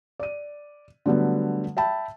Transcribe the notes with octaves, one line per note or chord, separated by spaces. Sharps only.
D5 D#7
D3 F#3 G3 A3 B3
E5 G5 A5 B5